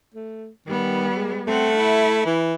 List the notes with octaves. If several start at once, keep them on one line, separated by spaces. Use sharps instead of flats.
A3
D#3 G3 B3
G#3
A3 C4 F#5
E4
E3